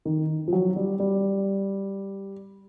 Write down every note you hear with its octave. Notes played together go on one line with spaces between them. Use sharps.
D#3
F3
F#3
G3
G3